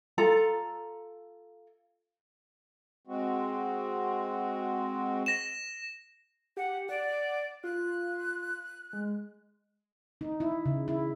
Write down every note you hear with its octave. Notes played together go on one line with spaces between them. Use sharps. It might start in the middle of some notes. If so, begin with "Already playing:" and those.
F4 A4 A#5
G#3 C4 F#4
A#6 E7
G4 F#5
D5 F#5
F4 F#6
G#3
D#4
E4
C#3
E4